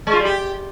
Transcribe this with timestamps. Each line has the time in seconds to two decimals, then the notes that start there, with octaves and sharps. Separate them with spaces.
0.07 G#3
0.13 F4
0.19 G3
0.25 G4